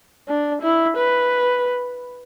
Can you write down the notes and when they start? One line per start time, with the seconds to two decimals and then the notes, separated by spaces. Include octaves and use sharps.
0.28 D4
0.62 E4
0.96 B4